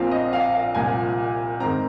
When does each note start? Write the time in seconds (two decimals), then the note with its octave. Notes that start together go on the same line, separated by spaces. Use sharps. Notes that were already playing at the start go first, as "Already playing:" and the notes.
Already playing: A#1 A#2 F3 C4 F5
0.11 D#5
0.33 F5
0.54 F5
0.75 C2 A#2 F3 G#5
1.60 G#2 D#3 C4 A#5